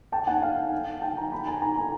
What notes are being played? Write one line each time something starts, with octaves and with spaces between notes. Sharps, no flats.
G5 A5
F#5 G#5
F5 G5
G5 A5
G#5 A#5
A5 B5
G#5 A#5
G#5 A#5
G#5 A#5